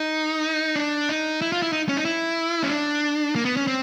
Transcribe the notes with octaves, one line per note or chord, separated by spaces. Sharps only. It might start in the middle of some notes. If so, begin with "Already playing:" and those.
Already playing: D#4
D4
D#4
E4
F4
E4
D#4
C#4
D#4
E4
C#4
D4
A#3
B3
C#4
C4